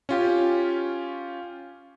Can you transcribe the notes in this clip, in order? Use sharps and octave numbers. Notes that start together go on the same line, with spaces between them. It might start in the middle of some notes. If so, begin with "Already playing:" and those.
C#4 F4 G4